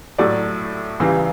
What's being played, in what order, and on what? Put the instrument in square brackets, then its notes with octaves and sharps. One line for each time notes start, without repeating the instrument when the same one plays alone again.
[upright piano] A2 F#3 A3 D5
C#2 C#3 E3 G3